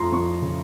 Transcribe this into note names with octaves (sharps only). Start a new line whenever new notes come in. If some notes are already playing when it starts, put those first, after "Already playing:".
Already playing: F2 F3 A#5 C6
F2 C#6
C#3